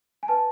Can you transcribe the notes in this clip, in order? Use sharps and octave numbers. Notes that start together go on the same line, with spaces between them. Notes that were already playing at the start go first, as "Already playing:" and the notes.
G#5
B4 A5